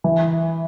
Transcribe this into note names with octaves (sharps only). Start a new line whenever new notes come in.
E3